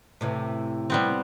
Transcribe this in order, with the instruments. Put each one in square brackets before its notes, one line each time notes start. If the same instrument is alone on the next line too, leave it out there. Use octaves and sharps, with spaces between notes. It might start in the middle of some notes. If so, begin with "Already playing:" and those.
[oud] A2 C3 E3
[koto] G3 B3 C4